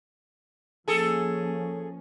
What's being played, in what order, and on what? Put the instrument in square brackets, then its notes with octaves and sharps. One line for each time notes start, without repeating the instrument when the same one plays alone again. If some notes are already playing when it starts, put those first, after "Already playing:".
[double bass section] F3 A#3 C#4 [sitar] G#4 A4